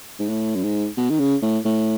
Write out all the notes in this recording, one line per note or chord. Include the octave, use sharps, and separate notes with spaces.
G#2
A2
F#2
G#2
B2
D#3
C#3
A2
A2